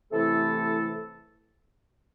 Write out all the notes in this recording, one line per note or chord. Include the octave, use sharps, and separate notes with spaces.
C3 E3 A3 E4 A4